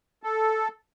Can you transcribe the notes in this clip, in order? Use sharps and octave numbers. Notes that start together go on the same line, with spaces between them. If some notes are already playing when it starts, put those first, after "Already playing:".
A4